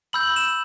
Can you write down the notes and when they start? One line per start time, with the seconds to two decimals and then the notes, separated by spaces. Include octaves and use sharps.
0.13 B5 E6 G6 F#7
0.36 E7